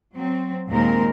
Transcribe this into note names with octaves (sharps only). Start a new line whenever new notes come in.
F#3 C4
D#2 A#2 G#3 C4 A#4